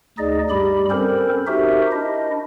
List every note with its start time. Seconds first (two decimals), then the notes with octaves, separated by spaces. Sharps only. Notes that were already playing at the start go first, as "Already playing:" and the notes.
0.18 D2 D#4 G#4 D5 D#5
0.50 G2 G3 G4 B5
0.90 C4 C#4 A4 A#4 C5
1.47 D#4 F#4 G4 A#4 C5 E5
1.92 D4 E4 D#5